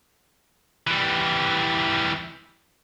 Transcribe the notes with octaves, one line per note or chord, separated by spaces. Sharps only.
E3 G3